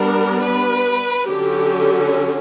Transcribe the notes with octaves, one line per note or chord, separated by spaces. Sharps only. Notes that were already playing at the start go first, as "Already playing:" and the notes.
Already playing: G3 B3 D4 A#4
B4
D3 F#3 C#4 G4